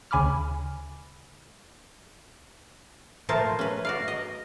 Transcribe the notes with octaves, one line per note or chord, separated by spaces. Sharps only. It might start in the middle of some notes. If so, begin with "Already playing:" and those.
D2 C#3 G#5 B5 D6 F6
A#2 F3 A3 A#4 C5 A5
C#4 B4
F#4 D5 F5
D#5